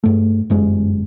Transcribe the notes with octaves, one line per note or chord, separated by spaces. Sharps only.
G2 A3
G1 F#2 G#3